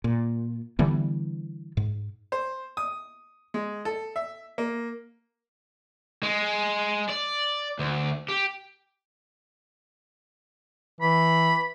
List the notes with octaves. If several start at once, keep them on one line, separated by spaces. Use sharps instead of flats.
A#2
D3 E3 G3 B3
G#2
C5
D#6
G#3
A4
E5
A#3
G#3
D5
D2
G4
E3 B5